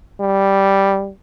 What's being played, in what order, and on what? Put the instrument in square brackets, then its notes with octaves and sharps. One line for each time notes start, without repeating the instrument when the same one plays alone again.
[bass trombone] G3